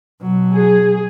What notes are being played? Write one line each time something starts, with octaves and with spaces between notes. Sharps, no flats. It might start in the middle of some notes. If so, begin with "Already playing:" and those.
B2 F#3
G#4